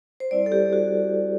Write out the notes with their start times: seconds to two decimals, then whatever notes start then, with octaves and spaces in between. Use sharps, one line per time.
0.20 C5
0.31 G3 C4 E4 D5
0.46 A4
0.52 G4
0.73 F#4